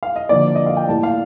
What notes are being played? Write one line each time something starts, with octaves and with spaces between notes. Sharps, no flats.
F5
D#5
D3 F3 A#3 D5
D#5
F5
G5
A2 G3 A#3 A5
F5